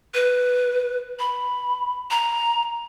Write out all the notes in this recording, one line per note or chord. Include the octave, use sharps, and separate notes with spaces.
B4
B5
A#5